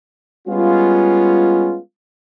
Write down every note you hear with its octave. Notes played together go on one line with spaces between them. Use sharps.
G3 G#3 B3 C#4 F4